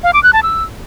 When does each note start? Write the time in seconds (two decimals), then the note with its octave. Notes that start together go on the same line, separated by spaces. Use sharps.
0.03 F5
0.13 D6
0.23 F#6
0.33 A5
0.43 E6